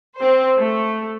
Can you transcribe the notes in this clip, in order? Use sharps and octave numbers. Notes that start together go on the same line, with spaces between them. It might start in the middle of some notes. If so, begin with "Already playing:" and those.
C4 C5
A3